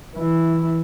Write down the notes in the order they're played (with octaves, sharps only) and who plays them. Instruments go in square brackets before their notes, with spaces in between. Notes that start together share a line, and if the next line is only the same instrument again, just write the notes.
[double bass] E3 E4